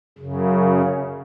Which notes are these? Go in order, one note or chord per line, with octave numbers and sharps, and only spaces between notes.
F#2 C#3